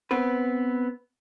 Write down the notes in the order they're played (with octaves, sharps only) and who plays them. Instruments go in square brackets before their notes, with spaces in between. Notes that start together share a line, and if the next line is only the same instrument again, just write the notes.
[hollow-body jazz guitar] B3 C4 B4